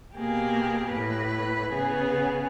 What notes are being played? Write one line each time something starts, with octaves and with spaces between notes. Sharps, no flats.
B2 A#3 G4 G#4
A2 B4
C#3 B3 G#4